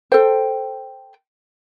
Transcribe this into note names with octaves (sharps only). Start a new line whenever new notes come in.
A4 C5 G5